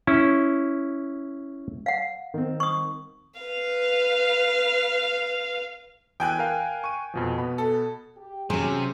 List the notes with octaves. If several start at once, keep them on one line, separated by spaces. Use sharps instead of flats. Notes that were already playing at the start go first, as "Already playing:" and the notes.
C#4 E4
F5 F#5
D#3 C4
C#6 D#6
B4 F5
E2 G5 G#5 F#6
A#4 F5
C#6 D#7
F2 B2 F3
B2 B3 B5
A4
G4
C3 F#3 C#4 G#4 C5